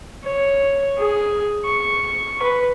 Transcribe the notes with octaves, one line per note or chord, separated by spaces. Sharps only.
C#5
G#4
C#6
B4